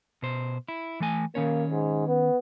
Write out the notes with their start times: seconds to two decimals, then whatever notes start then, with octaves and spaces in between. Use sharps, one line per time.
0.22 B2 C5
0.68 E4
1.00 E3 A3 G#5
1.35 D#3 A#3 C#4 C#5
1.70 G#2
2.07 B3